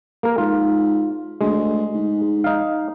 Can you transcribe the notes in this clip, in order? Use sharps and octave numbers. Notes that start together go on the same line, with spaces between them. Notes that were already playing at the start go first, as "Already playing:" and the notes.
A#3 A#4
G#2 F4
D2 G#3
G#2
D#4 F5